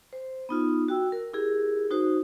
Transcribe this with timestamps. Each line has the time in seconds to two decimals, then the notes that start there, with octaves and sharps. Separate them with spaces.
0.13 C5
0.49 B3 D#4 F4
0.88 F#4 G5 E6
1.12 A#4
1.34 E4 G4 G#4 A#4
1.91 D#4 F#4 C5